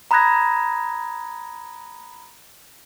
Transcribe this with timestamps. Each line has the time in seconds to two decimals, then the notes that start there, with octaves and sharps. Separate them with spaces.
0.11 A#5 B5 D#6 F#6 G#6 A#6